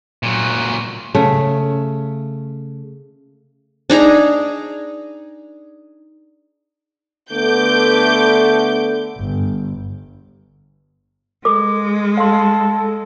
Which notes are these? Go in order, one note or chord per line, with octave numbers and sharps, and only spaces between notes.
A#2 F#3
C#3 A3
D4 D#4 G#4 A#5
D3 A3 B3 D6 G6
G1
G#3 A4 D6
A4 F5 C6